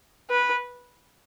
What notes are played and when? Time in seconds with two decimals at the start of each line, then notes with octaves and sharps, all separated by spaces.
0.30 B4